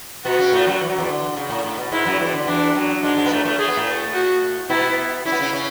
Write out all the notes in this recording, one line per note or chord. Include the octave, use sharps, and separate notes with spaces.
B2 B3 F#4
C#3 C#4
A2 A3
F#2 F#3
E3
F#3
E2 E3
D3
C#3
A2
A2
B2
G#2 G#3 E4
F#2 F#3
E2 E3
D3
E2 E3 D4
F#2 F#3
G#2 G#3 D4
G#2 G#3
B3
A2 A3
A2 A3
A3 G#4
B3
A2 A3
F#4
B2 B3 E4
C#4 E4
B3
C#3 C#4
C#3 C#4